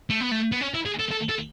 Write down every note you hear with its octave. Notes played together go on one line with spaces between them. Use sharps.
A3
B3
A3
B3
C#4
E4
G#4
A4
A4
A4